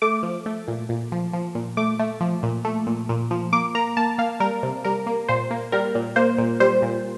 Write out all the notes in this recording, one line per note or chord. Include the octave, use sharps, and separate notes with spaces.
A3 D6
F3
A3
A#2
A#2
F3
F3
A#2
A3 D6
A3
F3
A#2
A3
A#2
A#2
F3
A#3 D6
A#3 A#5
A#3 A5
A#3 F5
G3 A#4
C3
G3 A#4
A#3
A#2 C5
A#3
G3 A#4
A#2
A#3 C5
A#2
G3 C5
A#2